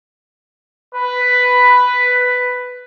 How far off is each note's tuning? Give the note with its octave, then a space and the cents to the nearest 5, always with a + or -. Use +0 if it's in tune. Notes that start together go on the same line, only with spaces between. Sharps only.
B4 +5